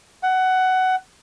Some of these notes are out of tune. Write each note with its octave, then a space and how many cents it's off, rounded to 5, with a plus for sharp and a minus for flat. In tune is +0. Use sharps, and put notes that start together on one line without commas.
F#5 +15